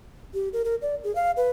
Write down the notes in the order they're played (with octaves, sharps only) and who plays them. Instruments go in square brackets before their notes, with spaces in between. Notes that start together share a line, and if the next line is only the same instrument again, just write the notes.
[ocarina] G4
A#4
A#4
D5
G#4
F5
B4